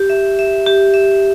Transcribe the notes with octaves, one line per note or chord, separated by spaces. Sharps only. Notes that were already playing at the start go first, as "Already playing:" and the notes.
Already playing: G4
E5
E5
G4
E5